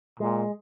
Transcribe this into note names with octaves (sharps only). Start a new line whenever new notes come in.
A#2 G#3